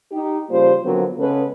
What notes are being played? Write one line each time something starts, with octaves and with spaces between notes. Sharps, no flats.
D#4 G4
C#3 F3 G3 A#3 F4 C5
D3 F3 F#3 B3 C4 A#4
C#3 G#3 B3 C#4 A4 B4